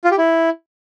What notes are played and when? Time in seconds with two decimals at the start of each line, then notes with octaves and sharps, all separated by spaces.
0.04 F4
0.11 G4
0.18 E4